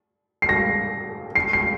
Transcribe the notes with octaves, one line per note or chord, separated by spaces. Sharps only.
C7
A#6
C7
C7